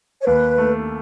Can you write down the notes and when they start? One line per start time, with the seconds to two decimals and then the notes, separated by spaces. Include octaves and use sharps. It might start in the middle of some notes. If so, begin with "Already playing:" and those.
0.22 C#5
0.26 D#2 B4
0.58 A3